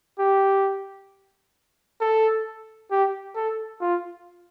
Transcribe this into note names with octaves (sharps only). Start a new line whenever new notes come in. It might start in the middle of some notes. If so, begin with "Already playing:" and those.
G4
A4
G4
A4
F4